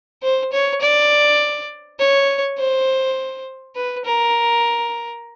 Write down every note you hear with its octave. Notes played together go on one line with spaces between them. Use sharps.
C5
C#5
D5
C#5
C5
B4
A#4